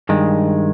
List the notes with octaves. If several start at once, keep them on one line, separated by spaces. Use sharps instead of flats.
G2 D#3 G#3